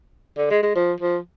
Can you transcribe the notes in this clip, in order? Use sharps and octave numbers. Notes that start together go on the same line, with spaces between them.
D3
G#3
G#3
F3
F3